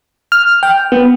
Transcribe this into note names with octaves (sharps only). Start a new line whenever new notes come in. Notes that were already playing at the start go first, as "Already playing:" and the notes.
F6
G5
B3